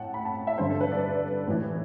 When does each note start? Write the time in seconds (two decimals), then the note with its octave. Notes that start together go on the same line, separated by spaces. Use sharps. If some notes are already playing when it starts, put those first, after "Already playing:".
Already playing: A2 F#5 G5 A5
0.14 B5
0.25 A5
0.47 E5
0.58 G2 D3 C5
0.70 A4
0.81 B4
0.92 D5
1.47 A2 E3